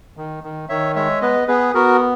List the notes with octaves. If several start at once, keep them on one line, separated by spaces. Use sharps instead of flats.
D#3
D#3
D#3 C#5 E5
G#3 C#5 E5
B3 B4 D#5
B3 G#4 B4
B3 F#4 A#4